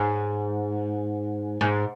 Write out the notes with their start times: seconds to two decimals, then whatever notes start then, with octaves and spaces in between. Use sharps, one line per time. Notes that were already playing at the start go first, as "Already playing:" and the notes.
Already playing: G#2
1.61 G#2